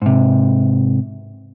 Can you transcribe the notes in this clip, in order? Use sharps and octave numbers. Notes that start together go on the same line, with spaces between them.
G#2 C3